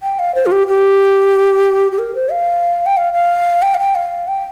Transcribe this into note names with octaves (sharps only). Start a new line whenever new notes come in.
G5
F5
C5
F4
G4
G4
G4
A#4
C5
F5
G5
F5
F5
G5
F5
G5
F5
G5